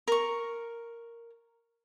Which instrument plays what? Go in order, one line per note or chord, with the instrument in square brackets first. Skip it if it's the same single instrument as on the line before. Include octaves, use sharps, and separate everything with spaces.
[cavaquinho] A#4 C#6